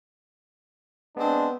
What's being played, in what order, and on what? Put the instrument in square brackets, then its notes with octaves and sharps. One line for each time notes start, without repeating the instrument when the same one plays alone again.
[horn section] G#3 C4 D4 [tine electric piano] B3